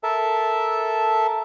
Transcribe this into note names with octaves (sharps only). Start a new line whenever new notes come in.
A4 A#4 E5 A5